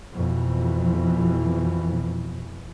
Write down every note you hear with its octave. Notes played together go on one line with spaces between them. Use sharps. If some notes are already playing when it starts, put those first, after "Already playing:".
F2 B2 E3